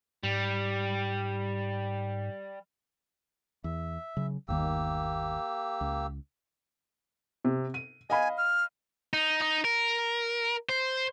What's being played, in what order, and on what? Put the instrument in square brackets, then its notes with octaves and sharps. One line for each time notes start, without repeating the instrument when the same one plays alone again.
[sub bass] G#2 [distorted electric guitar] G3
[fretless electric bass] E2 [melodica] E5
[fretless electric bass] C#3 F#3
[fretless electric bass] G1 D#2 D#3 [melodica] A#3 G4 E6
[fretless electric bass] C#2
[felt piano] C3
D#7
[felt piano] D#5 F5 B5 [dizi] G#5
[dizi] F6
[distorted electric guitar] D#4
D#4
A#4
C5